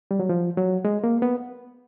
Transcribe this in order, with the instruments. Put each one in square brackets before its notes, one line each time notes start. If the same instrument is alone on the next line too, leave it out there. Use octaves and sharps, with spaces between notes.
[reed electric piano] G3
F#3
F3
F#3
G#3
A#3
B3